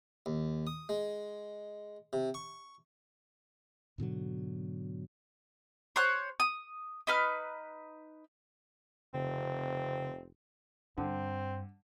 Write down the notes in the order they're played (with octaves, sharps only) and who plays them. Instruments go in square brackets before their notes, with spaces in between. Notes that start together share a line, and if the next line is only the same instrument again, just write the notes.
[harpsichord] D#2
D#6
G#3
C3
C#6
[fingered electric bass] G#2 B2 D3 F#3
[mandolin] C5 C#5 F#6
D#6
D#4 B4 F6
[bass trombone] F1 [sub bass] C#3 [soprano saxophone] C4
[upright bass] G2 [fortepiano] D3 [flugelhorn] C4